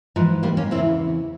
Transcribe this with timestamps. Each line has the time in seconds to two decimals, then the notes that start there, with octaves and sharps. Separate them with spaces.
0.16 G#2 E3 F3
0.43 G3 A#3
0.57 A#3 C#4
0.71 E2 C#3 E3 C4 E4